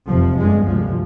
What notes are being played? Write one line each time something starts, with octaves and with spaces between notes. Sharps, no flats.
F1 F2 C3 F3
G1 G2 G#3
D2 C3 F3